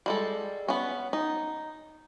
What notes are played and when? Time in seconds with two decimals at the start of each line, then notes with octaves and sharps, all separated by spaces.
0.06 G3 G#3 A4
0.68 B3 C#4
1.13 D#4